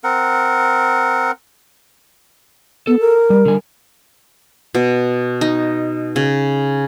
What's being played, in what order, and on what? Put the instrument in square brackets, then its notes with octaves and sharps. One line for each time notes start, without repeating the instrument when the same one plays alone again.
[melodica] C4 A#4 F#5
[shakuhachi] B3 [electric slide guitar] A4
[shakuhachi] A#4
[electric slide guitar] G3
D3 G3 G#5
[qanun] B2
D#4
C#3